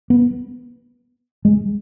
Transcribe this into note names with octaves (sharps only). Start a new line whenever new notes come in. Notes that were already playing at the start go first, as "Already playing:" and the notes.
B3
G#3